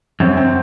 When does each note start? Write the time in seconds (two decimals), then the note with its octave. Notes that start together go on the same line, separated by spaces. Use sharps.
0.20 F#2 C4
0.37 C4